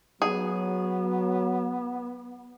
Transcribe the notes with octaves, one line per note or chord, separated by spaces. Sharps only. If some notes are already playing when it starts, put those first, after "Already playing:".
F#3 B3 G#4